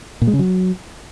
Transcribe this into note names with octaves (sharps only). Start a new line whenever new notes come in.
A#2
G#3
C#3
F#3